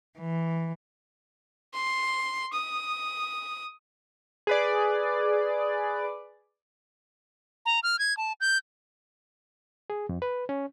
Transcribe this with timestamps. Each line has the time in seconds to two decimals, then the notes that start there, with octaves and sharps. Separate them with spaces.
0.19 E3
1.74 C6
2.53 D#6
4.47 G#4 B4 D5
7.66 A#5
7.83 F6
7.99 G#6
8.17 A5
8.41 G6
9.90 G#4
10.09 F2
10.22 B4
10.49 C#4